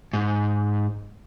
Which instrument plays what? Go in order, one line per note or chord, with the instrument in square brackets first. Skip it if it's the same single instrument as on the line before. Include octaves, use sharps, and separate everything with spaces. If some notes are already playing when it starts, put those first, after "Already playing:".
[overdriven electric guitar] G#2